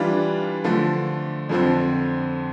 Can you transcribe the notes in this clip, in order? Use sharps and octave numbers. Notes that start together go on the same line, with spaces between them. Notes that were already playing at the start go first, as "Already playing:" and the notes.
Already playing: E3 G3 D4 F4 B4
D3 F3 A3
F2 D3 F3 C4